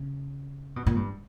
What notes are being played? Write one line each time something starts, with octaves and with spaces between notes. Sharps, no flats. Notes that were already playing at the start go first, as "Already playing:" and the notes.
Already playing: C#3
B2
A#2
G2